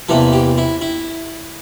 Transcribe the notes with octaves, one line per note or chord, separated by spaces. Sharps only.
E2 C3 E3 A#3 A4
G4
E4
E4